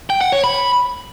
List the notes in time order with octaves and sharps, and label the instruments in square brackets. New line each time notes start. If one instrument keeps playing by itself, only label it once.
[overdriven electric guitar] G5
F#5
C#5
B5